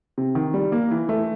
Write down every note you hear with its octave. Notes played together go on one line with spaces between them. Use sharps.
C3
D#3
G3
A#3
E3
A3